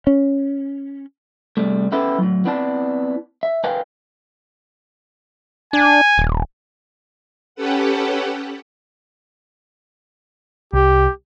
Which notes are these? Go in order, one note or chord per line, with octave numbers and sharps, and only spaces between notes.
C#4
C2 F#2 C3 G3 A3
B3 C#4 E4 G4 A4 B4
A2 F#3
B3 C4 E4 D5 G5 A5
E5
A#4 B4 D#5 F5 G5 G#5
D4 G#5
D#1
C#4 G4 A4 B4 F#5
C2 G4